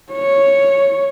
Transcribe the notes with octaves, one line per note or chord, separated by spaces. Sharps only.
C#5